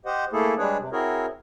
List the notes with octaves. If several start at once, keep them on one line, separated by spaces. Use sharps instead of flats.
G4 C5 D#5 F#5
A3 A#3 E4 G#4 A4
G3 G#3 D4 G#4 B4 C#5
C3
C4 E4 F#4 G#4 A#4 C#5